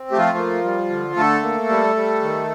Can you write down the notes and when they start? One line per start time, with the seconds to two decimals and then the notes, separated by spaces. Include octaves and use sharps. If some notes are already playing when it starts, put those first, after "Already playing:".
Already playing: C4
0.11 A3 G4
0.18 F3 F4
0.37 A#3
0.64 G3
0.90 D3
1.16 D3 A3 A4
1.43 A#3
1.69 G3
1.96 G3
2.22 D#3